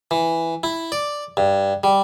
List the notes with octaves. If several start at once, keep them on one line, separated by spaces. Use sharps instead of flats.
E3
E4
D5
G2
G3